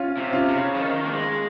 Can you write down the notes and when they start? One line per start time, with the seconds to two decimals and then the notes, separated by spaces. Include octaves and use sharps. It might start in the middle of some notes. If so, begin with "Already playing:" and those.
Already playing: C#4 F4
0.17 C3
0.33 C#4 F4
0.48 C#3
0.75 F3
0.80 D#3
1.05 A#3
1.11 G#3